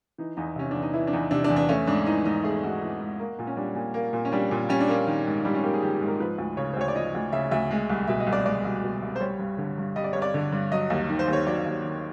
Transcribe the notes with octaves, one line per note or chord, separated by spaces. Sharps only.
E3 D#4
E2 D#4
C3 C#4
E2 D4
D#4
E3 E4
D4
E2 D#4
C3 D4
D4
E2
D4
A3 C#4
G#2 D4
E3 D#4
G#2 D#4
A3 G#4
G#2 F#4
E3
G#2
A#3
A#2
C#4
G3 D4
A#2
A#3
A#2
C#4
G3 D4
A#2
G3 C#4
D4
A#3 C#4
D#3
G#2
G3 D4
C#4
A#3 G4
G#4
D#3 G4
G4
G#2
A#4
F3 B4
D2
C#3 C#5
C5
D2 C#5
D5
F3 D#5
D2
C#3 E5
D2 E5
G#3
C2
B2 E5
D#5
C2
D5
G#3 D5
C2
B2
C2
C5
G3 C#5
G2
D3
G2
G3 D#5
D5
G2 C#5
D5
D3
G2
F#3 D#5
D#2
D#3
C5
D#2
C#5
F#3 D5
D#2
D#3